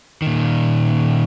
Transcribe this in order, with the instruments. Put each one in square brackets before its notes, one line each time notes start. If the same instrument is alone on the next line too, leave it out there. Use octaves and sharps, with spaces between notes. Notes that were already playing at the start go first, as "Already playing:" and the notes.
[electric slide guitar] A#2 D#3